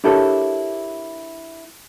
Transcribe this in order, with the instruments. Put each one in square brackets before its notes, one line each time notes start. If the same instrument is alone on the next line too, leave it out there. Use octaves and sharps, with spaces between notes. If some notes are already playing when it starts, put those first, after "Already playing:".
[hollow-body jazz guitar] D4 E4 G4 A4 A#4 C#5